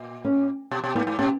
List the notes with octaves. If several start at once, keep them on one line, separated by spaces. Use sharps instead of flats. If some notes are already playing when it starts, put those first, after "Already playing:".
Already playing: A#2
C#4
B2
B2
G#2 B3
G#2
B2 C#4